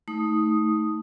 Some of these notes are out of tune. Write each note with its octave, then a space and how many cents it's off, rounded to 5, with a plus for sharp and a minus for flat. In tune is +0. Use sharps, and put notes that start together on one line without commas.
A3 +0 D#4 +30 D#6 +0